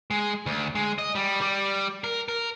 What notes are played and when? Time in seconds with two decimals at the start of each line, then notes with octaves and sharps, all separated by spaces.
0.11 G#3
0.46 D2
0.75 G#3
0.98 D#5
1.15 G3
1.41 G3
2.04 A#4
2.28 A#4